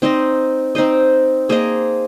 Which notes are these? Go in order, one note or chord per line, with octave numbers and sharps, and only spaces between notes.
C4 D#4 C5 D#5
C4 D#4 C5 D#5
A#3 G#4 C5 D#5